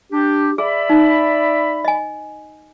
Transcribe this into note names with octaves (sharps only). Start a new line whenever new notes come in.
D4 G4
G#4 D5 E5 B5
D#4
D#5 G#5